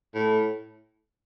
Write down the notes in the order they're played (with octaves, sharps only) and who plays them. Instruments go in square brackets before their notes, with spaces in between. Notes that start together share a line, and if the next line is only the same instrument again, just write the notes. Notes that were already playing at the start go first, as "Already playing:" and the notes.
[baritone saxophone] A2